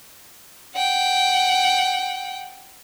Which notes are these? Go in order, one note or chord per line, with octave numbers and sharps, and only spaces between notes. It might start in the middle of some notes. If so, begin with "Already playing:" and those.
F#5 G5